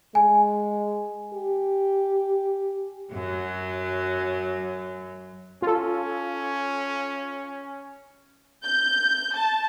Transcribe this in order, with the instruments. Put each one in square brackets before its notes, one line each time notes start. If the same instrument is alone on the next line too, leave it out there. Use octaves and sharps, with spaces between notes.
[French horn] G#3 [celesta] G#5
[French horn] G4
[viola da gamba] F#2 F#3
[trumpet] C#4 [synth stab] F4 A4
[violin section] G6
A5